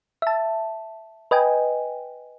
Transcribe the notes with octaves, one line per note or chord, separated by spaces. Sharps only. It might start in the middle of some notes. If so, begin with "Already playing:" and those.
E5 A5
B4 D#5 G5 G#5